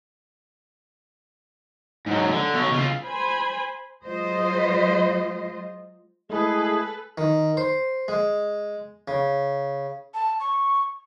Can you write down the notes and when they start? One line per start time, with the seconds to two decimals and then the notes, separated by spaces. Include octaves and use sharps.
2.06 G#2 F#3
2.31 D3
2.54 B2 C#5
2.72 C#3 F4
3.03 C5 G#5 B5
4.05 F#3 G#3 F4 C5 D#5
6.30 G#3 A3 E4 G#4 A4 B4
7.18 D#3
7.57 C5
8.08 G#3
9.08 C#3
10.14 A5
10.40 C#6